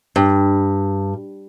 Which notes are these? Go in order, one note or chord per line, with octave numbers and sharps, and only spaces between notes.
G2